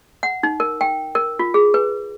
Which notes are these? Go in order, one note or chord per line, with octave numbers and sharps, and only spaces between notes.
F#5
D#4
A#4
G5
A#4
F4
G#4
B4